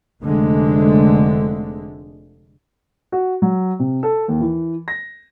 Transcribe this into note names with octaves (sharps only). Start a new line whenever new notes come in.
F1 D3 G#3 A3
F#4
F#3
C3
A4
D#2
E3
A#6